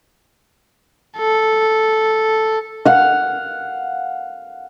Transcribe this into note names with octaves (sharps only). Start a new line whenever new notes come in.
A4
F5 F#5